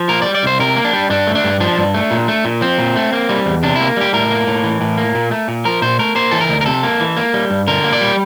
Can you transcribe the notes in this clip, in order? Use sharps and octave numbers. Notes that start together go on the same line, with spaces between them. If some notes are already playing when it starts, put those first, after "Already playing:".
Already playing: F3
A#3 A#4
D5
G3
D5
C2 C5
C3 A#4
A#3
D4
G3
G2 D4
A3
D4
G2
F3 D4
G2
A3
A#2
A3
A#2
F3 C4
A#2
A3
A#3
G3
E2
C3 D4
A#3 E4
G3 G4
A2 A#4
A#3
A2
E3
A2
A#3
A#2
A3
A#2
F3 A#4
A#2 C5
A3 A#4
A#3 C5
E3 A4
A#4
D2
A#4
C3 A4
A#3
E3
A#3
G3
G2
D3 A#4
A#3
D5
G3